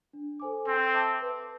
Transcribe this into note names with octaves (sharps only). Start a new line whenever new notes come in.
D4
A4 C5 G#5 D6
C4 A4
E5 A5 D6
B4